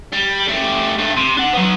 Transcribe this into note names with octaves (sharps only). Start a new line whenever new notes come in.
G3
A3 G4
G2 A3
C3
D4 F#5
F#3 B3